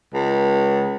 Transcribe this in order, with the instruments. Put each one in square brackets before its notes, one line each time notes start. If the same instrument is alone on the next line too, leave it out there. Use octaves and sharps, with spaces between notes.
[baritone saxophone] C#2